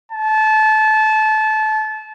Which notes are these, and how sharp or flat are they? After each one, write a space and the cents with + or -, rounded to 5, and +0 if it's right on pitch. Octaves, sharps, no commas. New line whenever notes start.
A5 -25